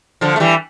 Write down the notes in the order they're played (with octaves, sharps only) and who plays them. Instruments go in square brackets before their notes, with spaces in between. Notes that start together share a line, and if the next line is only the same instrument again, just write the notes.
[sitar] D3 F3
A3
E3 G3